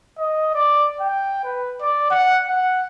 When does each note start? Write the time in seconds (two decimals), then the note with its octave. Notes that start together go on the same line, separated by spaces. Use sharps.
0.18 D#5
0.54 D5
1.01 G5
1.44 B4
1.81 D5
2.11 F#5
2.48 F#5